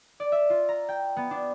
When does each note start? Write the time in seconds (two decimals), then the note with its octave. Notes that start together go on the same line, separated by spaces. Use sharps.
0.20 D5
0.32 E5
0.50 F4
0.69 A#5
0.89 G5
1.17 B3
1.31 D4